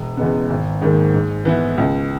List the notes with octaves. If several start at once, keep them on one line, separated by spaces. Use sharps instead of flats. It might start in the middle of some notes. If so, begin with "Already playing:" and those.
Already playing: E1
E2 C#3 G#3 B3
G#1
G#2 D#3 A#3
G#2
E3 B3 E4
C#2